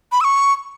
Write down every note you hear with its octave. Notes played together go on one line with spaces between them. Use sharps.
B5
E6
C#6